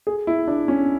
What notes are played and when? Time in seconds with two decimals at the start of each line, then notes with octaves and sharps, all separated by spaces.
0.07 G#4
0.27 E4
0.48 D4
0.68 C#4